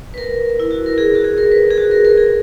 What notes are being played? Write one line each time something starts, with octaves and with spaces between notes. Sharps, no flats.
B4
A#4
E4
F#4
A#4
G#4
F#4
G#4
A#4
B4
G#4
F#4
A#4
A#4
G#4